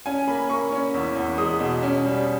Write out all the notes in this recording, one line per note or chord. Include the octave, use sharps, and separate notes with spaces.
C#4 G#5
A#3 B5
A#3 C#6
C#4
E2
E2
G#3 D#6
B2
C#4
G3